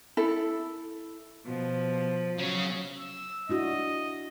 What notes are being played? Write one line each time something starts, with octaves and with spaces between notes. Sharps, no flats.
E4 A4
B2 F3
C#3 F#3
E6
D4 E4 F#4 D#5